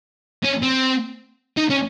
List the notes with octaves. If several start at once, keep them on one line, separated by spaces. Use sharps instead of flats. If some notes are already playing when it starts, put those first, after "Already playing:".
C#4
C4
D#4
C#4